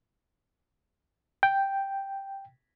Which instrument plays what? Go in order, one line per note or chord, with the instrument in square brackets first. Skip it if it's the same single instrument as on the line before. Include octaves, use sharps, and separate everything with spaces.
[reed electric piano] G5